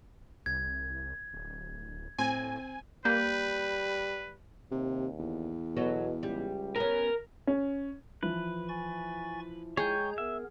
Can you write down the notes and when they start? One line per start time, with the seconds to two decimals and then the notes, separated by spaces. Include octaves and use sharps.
0.46 C2 G#6
1.33 D1
2.19 A2 C4 G#5
3.05 G3 A#3 B4 G6
4.71 D#2 C3
5.19 E2
5.77 B2 F#3 A4 B4
6.23 C#2 G3
6.76 B3 C#4 A#4
7.47 C#4
8.23 E3 F3 B4
8.68 G#5 C#6 A6
9.77 G#3 G#4 C#5 G5 A#5 G6
10.18 B3 A#4 E5